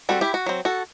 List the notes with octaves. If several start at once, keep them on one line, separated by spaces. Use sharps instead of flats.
G3 C4 F#4 A4
E4 G4
F#4
F#3 C4
F#4 A4